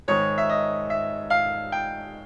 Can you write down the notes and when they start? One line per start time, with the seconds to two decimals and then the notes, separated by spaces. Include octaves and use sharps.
0.08 G#2 D#3 C#5
0.38 E5
0.49 D#5
0.90 E5
1.30 F5
1.72 G5